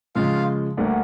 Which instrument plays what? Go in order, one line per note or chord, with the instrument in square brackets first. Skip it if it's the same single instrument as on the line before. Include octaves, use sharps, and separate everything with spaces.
[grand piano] C#3 F3 G#3 [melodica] F4 F5
[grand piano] D2 D3 G3 A#3